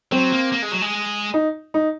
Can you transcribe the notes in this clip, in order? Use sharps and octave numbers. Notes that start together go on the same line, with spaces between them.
F#3 C4
A#3
A#3
G#3
F#3
G#3
D#4
D#4